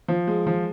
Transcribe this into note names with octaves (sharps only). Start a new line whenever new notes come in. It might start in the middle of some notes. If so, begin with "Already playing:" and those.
F3
G#3
F3